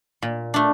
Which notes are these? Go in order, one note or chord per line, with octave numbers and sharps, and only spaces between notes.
A#2
A3 D4